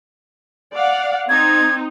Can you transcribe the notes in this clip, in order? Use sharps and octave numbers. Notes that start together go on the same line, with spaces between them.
D5 F5 F#5
C4 D#4 G#6